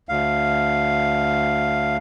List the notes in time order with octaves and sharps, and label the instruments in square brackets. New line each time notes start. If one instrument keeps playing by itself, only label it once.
[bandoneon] D2 F5